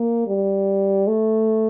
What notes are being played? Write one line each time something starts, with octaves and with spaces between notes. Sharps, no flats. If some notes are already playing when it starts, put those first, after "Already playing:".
Already playing: A#3
G3
A3